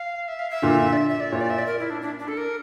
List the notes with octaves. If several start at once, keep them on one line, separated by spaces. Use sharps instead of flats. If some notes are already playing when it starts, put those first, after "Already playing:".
Already playing: F5
E5
F5
E5
A#2 D3
D5
E5
E5
D5
A#2 C#5
D5
E5
D5
A#4
E4
D4
D4
D4
A4
A#4